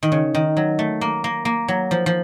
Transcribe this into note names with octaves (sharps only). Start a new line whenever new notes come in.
D#3
C#3
D#3
F#3
A3
A#3
A#3
A#3
F#3
F3
F3